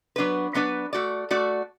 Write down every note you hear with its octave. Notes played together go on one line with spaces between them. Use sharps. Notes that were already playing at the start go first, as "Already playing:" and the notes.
F#3 B3 D4 B4
F#3 B3 D4 B4
A3 F#4 D5
A3 F#4 D5